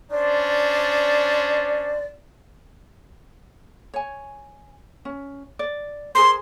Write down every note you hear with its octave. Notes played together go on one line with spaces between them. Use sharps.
C#4 D4 C5 D5
C#5 G#5
C#4
D5
G#4 A#4 C5 C6